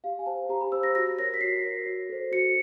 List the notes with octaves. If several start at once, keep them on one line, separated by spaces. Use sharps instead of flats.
G4 F5
G#5
C5 A5
G4 A#5
B5
C5 E6
A#6
F#4 A#6
A#4 C#5 A#6
B6
F#4 C7
A#4 C#5
F#4
A4 C5
F#4 C#7